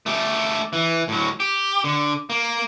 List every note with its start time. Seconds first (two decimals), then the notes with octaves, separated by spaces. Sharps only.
0.06 A3 G4
0.73 E3
1.08 A2 F#3
1.40 G4
1.84 D3
2.30 A#3